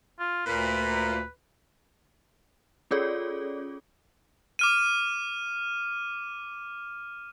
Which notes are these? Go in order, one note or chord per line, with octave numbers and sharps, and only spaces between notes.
F4
D2 A#2 B4
C#4 F4 G#4 A4 C#5 D5
D6 F6 D#7